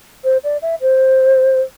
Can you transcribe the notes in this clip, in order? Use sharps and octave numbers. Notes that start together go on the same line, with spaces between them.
C5
D5
E5
C5